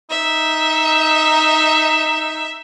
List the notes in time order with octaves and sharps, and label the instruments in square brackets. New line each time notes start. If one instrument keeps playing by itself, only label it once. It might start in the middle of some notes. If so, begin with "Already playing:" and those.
[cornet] D#4 [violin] E5